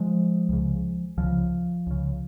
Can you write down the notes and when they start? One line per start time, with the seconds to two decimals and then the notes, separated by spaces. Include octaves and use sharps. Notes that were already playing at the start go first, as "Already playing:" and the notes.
Already playing: F3 G#3
0.49 C#2 C#3
1.18 C#2 C#3 F3
1.86 C#2 C#3